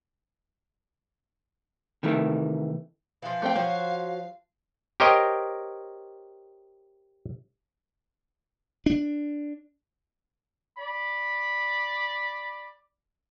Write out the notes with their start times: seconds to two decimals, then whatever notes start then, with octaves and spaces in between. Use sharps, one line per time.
2.03 C3 D#3 E3 A3
3.22 E3 F3 F5
3.42 A3 C4 G5
3.55 F3 F#4 C5 C#5
5.00 G4 A#4 C5 C#5 D#5 G5
8.86 D4
10.78 D5 B5